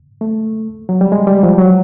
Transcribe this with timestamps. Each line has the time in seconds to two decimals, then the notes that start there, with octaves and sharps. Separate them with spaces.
0.21 A3
0.89 F#3
1.01 G3
1.12 G#3
1.27 G3
1.43 F3
1.58 F#3